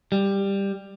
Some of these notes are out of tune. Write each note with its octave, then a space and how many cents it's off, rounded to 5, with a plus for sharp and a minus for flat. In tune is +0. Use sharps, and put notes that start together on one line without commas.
G3 +10